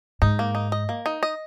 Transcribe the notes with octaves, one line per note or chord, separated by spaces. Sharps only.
G#2 D#4
A#3
D#4
D#5
A#3
D#4
D#5